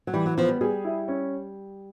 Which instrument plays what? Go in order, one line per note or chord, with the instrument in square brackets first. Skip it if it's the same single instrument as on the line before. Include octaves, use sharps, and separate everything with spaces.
[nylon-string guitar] F#3
[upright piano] E3 [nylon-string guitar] G3
[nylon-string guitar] F#3
[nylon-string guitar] F3 [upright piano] B3
[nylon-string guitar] G3
[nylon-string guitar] G3 [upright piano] G#4
[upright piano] E4
C#4